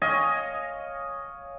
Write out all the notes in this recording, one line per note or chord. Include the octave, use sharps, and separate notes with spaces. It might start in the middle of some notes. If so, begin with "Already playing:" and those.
C#5 D#5 F5 G#5